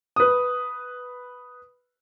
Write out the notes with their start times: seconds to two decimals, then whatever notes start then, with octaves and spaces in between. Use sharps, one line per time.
0.16 B4 D#6